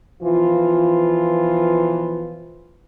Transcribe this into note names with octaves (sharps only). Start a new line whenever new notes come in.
B2 E3 F3 F4